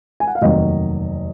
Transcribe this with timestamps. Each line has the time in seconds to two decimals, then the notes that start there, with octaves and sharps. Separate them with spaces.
0.20 G#5
0.27 F#5
0.35 F5
0.41 F1 D#2 D#3 F#3 D#5